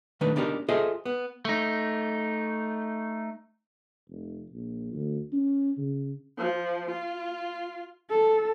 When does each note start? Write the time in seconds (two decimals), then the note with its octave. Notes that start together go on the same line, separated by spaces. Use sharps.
0.21 D#3 A3 D4 B4
0.36 B3 D4 D#4 G4 A#4
0.69 F4 G#4 A4 C5 D#5 E5
1.05 B3
1.45 A3 D#4
4.09 F1
4.52 A#1
4.93 D2
5.32 C#4
5.77 C#3
6.38 F3
6.91 F4
8.10 A4